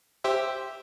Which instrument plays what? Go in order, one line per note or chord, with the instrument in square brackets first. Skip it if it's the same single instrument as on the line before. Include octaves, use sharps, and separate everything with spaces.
[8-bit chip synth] G4 C5 E5